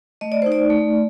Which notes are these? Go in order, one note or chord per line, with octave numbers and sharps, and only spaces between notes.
A3 D#5
D5
D#4 C5
D5
A3